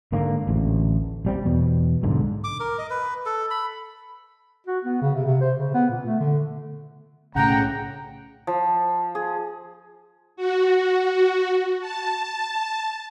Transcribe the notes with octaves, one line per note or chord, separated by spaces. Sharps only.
G#2 D3 A#3
A1 D2
A#1 G3 C4
E2 B2
B1 G#2 D3
D6
A#4
D#5
B4
A4
B5
F#4
B3
C#3
C3
C3
C5
C#3
B3
A#2
A3
D3
B1 A2 C#3 A3 F#5 G5 A#5
F3
G#4
F#4
A5